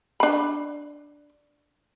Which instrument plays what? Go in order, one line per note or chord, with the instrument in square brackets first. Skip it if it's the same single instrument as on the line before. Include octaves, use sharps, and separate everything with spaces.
[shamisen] D4 B5